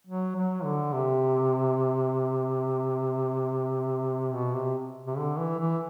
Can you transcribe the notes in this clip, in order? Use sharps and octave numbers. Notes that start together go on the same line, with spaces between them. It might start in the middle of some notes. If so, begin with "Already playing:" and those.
F#3
F#3
D3
C3
B2
C3
C3
D3
E3
E3